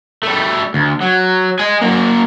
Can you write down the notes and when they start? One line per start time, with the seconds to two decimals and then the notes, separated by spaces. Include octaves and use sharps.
0.23 G3 A3
0.74 D2
1.01 F#3
1.59 D#5 G#5
1.82 F#3 A#3